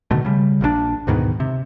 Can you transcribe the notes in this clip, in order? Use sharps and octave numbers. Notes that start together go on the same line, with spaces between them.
B2 D3 D#3 A3
C#3 G3
A#1 A#2 D3 D4
D2 G#2 B2 D#3
C3